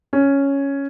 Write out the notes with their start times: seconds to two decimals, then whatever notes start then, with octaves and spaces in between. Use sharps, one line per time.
0.13 C#4